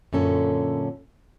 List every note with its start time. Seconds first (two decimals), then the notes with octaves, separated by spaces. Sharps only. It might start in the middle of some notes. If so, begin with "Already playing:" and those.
0.13 F#2 A#2 D3 C#4 A4